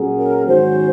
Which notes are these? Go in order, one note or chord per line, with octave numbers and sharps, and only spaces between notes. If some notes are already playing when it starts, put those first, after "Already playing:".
Already playing: A#2 F#3 C#4 G#4
A#4
G#2 D#3 F#3 C#4 F#4 C5